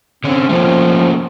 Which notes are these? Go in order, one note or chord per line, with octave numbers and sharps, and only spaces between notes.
D3 C4 C#4
F3 A3 A#3 C#4